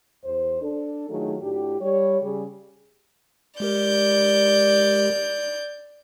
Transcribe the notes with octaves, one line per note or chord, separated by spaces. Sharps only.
E2 C5
D4 A4
D#3 F#3 A3 D#4 F4 G#4
A2 D4 F#4 G4
G3 C#5
C#3 G3 G#4
G#3 G4 A#4 D5 G6